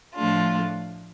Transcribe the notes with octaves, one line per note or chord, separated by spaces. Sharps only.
A2 F3 A3 D4 F4